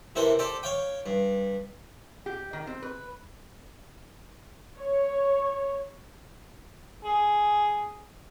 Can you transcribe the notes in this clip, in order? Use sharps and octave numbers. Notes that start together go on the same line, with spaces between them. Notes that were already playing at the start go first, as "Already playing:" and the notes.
C3 E3 C4 A4 A#4 C5
G4 A4 C5 D5
C#5 F5 G5
G2
G4
D#3
C4
B4
C#5
G#4